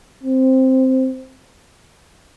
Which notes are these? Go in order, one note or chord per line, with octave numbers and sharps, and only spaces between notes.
C4